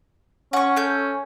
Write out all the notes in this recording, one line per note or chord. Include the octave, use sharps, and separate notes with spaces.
C#4 F#5 C#6
A3 G6